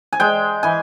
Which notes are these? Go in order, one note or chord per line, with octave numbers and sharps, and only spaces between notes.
G#5
G#3 G5
E3 G#5